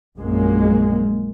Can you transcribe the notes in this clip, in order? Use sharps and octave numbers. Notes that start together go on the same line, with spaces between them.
A#1 F#2 A#2 G#3 A#3